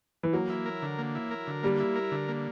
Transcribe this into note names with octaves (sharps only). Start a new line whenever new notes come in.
E3
F#3 A#3
E4
A#4
D3
A#3
E4
A#4
D3
G3 A#3
E4
A#4
D3
A#3